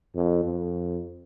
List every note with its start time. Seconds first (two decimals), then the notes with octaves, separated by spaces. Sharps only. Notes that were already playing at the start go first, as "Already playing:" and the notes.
0.15 F2
0.45 F2